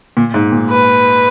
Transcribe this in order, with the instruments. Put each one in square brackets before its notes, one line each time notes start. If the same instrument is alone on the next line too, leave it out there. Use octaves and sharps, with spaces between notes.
[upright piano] A#2
G#2
A#2
[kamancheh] B4